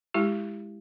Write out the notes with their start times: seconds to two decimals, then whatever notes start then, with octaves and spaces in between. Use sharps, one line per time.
0.14 G#3 E4 G4